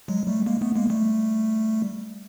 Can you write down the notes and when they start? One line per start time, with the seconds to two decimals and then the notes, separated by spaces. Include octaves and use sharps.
0.08 F#3 G#3
0.27 G3 A3
0.46 G#3 A#3
0.61 A3 B3
0.76 G#3 A#3
0.90 G3 A3